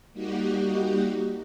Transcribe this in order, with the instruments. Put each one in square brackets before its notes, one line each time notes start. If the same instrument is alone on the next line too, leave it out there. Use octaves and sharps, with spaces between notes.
[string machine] G3 A#3 D#4 F#4 G4